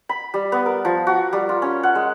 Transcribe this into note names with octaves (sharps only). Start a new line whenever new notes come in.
B5
G3
B3
A#4
F3
F#4
G3
F4
C#4
F#5
G#3